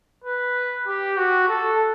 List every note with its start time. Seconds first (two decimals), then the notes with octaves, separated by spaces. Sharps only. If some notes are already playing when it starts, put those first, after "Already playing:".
0.24 B4
0.87 G4
1.17 F#4
1.49 A4